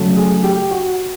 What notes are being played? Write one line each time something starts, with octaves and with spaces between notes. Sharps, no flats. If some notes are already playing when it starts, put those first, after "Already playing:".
Already playing: C#3 F#3 A3
G#4
G4
F#4